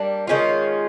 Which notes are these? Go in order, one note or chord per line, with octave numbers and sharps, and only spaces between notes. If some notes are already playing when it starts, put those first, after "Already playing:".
Already playing: G3 A#3 D4
D#3 G#3 C#4 F4